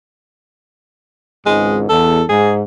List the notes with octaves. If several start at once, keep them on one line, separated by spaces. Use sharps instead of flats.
G#1 C#2 G#2 G#3
E2 A4
G#2 G#4